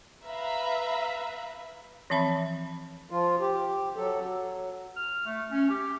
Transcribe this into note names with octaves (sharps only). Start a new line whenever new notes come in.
B4 E5 F5 A#5 B5
E3 F3 C4 E5 B5
F3 F4
G4
F#3 A4
F#3
F6
A3
C#4
G4